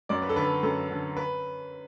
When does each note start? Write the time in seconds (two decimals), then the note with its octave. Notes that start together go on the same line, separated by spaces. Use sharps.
0.09 F#2 D5
0.22 B4
0.29 A4
0.36 D3 B4
0.63 F#2 A4
0.91 D3
1.17 B4